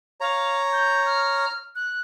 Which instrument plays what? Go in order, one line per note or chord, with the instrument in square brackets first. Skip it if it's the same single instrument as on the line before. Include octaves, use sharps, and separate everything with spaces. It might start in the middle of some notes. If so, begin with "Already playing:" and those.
[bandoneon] C#5 A#5 [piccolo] F5
[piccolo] G6
F6
F#6